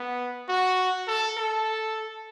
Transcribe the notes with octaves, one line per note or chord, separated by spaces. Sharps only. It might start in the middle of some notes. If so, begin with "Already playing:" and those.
Already playing: B3
F#4
A4
A4